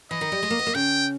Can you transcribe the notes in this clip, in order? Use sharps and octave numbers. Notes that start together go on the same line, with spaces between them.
E3 D#5
D#3
G3
G#3
A#3
B3
A#3
C#3 G5